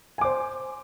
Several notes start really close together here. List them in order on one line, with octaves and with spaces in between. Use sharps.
G#5 D6 C5